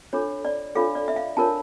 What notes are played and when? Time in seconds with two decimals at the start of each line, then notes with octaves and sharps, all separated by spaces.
0.13 D4 F4 A4 C#5
0.45 D5
0.75 D4 F4 A4 C#5 F5
0.95 D5
1.08 E5
1.16 F5
1.37 D4 F4 A#4 C#5 A5